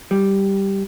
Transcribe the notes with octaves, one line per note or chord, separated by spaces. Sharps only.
G3